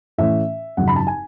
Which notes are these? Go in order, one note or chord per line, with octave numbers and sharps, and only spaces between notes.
A2 E3 A3 C#4 E5
G#1 F#2 C#3 F#3 F#5
B5
A5
G#5